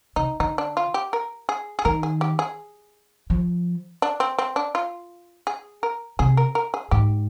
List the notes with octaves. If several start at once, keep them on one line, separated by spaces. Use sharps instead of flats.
C3 D#4
D3 D#4
D4
F4
G4
A#4
G#4
G#4
D#3 A#4
G#4
G4
G#4
F3
D4
C4
C4
D4
F4
G#4
A#4
C3 G#4
A#4
A#4
G#4
G#2 G4